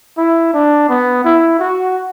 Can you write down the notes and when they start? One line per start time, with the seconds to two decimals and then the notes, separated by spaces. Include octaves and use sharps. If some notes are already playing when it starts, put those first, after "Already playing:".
0.18 E4
0.53 D4
0.89 B3
1.24 E4
1.60 F#4